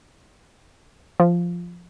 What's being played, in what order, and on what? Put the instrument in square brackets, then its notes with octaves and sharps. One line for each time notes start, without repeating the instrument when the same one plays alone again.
[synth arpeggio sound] F3